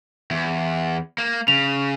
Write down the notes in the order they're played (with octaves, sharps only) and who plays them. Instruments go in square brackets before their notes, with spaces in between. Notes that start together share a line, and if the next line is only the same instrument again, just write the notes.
[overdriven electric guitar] E2
A#3
[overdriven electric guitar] C#3 [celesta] F7